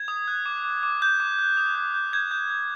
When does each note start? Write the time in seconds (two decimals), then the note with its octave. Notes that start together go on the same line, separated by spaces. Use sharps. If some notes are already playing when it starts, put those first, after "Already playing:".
Already playing: G#6
0.08 D#6
0.28 F#6
0.46 D6
0.64 D6
0.83 D6
1.01 F#6 G6
1.20 D6
1.39 F#6
1.57 D#6
1.75 G6
1.94 G6
2.13 G6 G#6
2.31 G6
2.50 G6